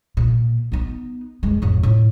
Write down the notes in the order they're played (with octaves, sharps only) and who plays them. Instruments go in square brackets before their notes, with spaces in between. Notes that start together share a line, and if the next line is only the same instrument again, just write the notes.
[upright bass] A#2
B3 D#4
F#2 G#3
A1 F2
A2